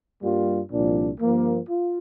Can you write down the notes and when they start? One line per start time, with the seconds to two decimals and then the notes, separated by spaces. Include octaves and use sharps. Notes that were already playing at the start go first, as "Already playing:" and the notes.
0.23 G2 G3 A#3 F4
0.71 C2 A#2 F3 D4
1.21 G2 F3 A#3
1.69 F4